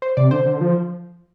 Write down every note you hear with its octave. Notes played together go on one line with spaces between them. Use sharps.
C5
C3 D5
D3 C5
D3
F3